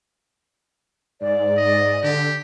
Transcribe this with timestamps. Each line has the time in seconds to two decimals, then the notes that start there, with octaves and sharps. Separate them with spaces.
1.21 G#2 D5
1.57 D#5
2.03 D3 G4